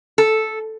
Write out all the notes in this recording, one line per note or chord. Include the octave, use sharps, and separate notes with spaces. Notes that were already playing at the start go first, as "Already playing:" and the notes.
A4